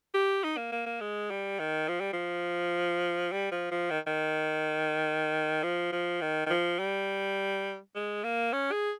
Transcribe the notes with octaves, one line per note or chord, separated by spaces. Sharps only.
G4
D#4
A#3
A#3
A#3
G#3
G3
D#3
F3
G3
F3
G3
F3
F3
D#3
D#3
F3
F3
D#3
D#3
F3
G3
G#3
A#3
C#4
G#4